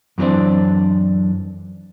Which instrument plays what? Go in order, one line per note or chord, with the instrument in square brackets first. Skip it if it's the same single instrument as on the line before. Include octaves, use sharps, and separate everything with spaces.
[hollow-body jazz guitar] F#2 E3 A#3 C4 D4